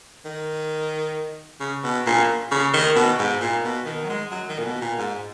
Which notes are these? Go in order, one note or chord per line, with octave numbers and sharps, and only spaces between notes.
D#3
C#3
B2
A#2
C#3
D#3
B2
G#2
A#2
B2
D#3
F#3
G#3
F#3
D#3
A#2
B2
A#2
G#2